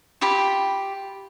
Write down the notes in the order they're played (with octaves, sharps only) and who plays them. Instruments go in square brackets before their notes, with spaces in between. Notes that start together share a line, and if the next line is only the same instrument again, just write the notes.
[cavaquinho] F4 G4 B5